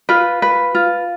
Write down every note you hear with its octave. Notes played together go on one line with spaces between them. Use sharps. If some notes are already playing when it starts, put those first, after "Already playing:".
F4 B4
B4
F4